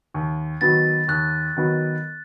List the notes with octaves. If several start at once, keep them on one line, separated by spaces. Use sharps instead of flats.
D#2
D#3 F#3 B3 A6
D#2 F#6
D#3 F#3 B3